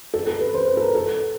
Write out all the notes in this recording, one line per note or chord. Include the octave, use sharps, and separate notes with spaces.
A4
A4
B4
C5
B4
A4
A#4
A4